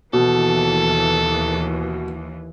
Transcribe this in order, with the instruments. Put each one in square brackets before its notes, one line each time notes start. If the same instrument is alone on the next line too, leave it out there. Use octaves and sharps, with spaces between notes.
[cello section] D#2 E3 [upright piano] B2 [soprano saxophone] A4